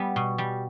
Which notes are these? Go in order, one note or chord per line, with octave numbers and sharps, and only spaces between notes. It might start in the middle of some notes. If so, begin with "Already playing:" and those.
Already playing: G3 B3
B2
G3